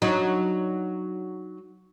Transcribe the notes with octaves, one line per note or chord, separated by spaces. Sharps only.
F#3 D4 D#4